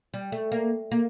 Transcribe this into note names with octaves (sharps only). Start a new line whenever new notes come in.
G3
A3
A#3
A#3